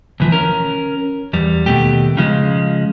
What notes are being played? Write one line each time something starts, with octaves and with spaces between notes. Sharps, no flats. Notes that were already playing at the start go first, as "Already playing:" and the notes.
D2 E3 F3
C#4 A#4
E2 G3
D#2 B2 A3 G4
C#3 F3 G#3